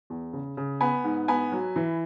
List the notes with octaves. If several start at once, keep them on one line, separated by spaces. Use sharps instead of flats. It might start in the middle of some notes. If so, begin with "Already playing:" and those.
E2
C#3
C#3
B3 G#5 B5
G#2
B3 G#5 B5
F#3
E3